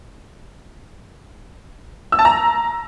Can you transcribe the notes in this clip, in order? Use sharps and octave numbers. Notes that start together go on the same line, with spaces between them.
E6
A5
A#5